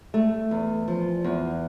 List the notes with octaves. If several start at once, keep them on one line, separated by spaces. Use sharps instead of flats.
A3
E2
F3
E2